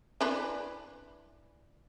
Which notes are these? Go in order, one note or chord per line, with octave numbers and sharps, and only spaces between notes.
E3 D4 B4